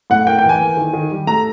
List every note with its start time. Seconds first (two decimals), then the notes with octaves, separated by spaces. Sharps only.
0.10 A2 F#5
0.27 A#3 G5
0.39 G5
0.44 E3
0.49 G#5
0.61 A#3
0.77 D#3
0.93 D#3
1.11 G3
1.27 A3 A#5